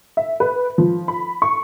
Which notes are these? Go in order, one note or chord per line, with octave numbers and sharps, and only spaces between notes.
E5
B4
F3
B5
C#6